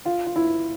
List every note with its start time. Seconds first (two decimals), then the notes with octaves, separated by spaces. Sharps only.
0.05 F4
0.26 F4
0.36 E4